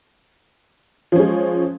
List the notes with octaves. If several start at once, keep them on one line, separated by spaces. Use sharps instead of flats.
F3 G#3 C#4